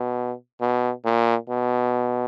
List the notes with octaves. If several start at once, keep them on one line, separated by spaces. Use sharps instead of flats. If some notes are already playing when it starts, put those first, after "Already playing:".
Already playing: B2
B2
A#2
B2